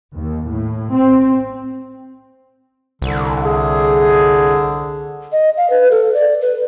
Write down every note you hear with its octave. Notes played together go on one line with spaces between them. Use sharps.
D#2
A2
C4
C2 D3
G#4
D#5
F5
B4
A4
D5
B4